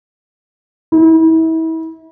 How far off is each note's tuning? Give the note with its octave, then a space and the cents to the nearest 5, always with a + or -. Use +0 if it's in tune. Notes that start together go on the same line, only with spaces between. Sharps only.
E4 -35